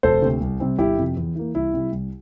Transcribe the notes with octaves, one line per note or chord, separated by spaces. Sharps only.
E1 A4 C5
D2 C3
C2
C3 G3 C4
G1 E4 G4
F2 C3
E2
E3 A#3
C2 E4
C3 G3
C2